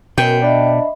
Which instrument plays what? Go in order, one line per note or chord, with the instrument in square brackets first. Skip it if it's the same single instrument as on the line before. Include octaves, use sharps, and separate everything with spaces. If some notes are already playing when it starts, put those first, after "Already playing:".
[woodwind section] F#2 [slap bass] B2 [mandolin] G5
[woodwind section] D4 [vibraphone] D#5 E5 B5